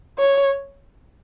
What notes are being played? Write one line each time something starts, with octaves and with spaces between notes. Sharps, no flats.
C#5